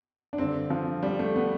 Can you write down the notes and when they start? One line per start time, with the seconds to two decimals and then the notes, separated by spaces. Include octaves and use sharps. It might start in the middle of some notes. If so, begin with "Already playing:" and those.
0.33 D4
0.38 G2 D3 C4
0.70 F3
1.03 G3
1.19 A3
1.36 B3